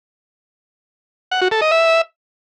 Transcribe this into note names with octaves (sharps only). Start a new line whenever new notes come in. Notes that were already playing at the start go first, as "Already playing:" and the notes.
F#5
F#4
A4
D#5
E5